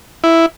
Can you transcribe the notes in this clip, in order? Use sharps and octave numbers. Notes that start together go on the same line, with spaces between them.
E4